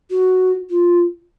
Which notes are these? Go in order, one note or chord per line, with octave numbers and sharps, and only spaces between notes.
F#4
F4